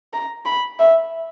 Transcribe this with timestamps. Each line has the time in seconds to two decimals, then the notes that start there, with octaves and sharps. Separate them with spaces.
0.13 A#5
0.45 B5
0.79 E5